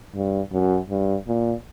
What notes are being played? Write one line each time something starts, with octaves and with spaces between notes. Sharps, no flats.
G2
F#2
G2
A#2